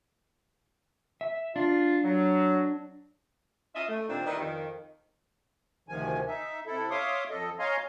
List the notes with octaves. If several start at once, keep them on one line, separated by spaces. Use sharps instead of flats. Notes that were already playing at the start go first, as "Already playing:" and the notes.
E5
D4 F4
F#3
C#4 F4 D#5 E5
A3
A#2 D#3 G3 C4 D4
D#3 G3 E4 B4 D#5
F2 D#3
D2 C3 D#3 F3 G#5
D#4 E5
C3 E4 A4
C#5 E5 F5 C6 D6 D#6
F2 A4 D#5
C#5 D#5 F5 G#5 A#5 C6